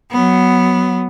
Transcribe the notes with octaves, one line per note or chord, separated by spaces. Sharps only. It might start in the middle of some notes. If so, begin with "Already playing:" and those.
F#3 B3